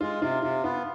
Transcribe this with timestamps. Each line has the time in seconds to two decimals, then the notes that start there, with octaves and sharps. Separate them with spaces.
0.01 G#3 F4
0.22 C3 F4
0.43 C3 F4
0.64 B3 F4